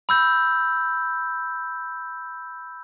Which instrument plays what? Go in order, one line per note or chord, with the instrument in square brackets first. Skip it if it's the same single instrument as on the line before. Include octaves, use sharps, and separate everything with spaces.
[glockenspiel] B5 E6 G6